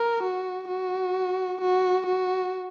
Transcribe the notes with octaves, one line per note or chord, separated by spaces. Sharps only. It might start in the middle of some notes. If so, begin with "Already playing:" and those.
Already playing: A#4
F#4
F#4
F#4
F#4